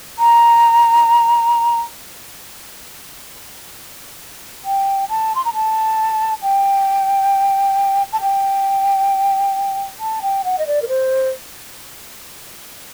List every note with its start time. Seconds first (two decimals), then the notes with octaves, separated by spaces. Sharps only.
0.19 A#5
4.65 G5
5.09 A5
5.35 C6
5.45 A#5
5.54 A5
6.42 G5
8.13 A5
8.22 G5
10.00 A5
10.22 G5
10.44 F#5
10.59 D#5
10.67 D5
10.82 A#4
10.88 C5